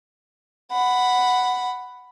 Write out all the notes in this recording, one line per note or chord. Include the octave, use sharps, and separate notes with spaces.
F#5 B5